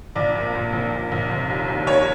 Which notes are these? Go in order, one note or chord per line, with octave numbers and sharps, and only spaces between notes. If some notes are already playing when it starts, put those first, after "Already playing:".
A#1 D5
A#2
A#2
A#1
A#1
A#1
F1
D#2
D#2
D#2 C#5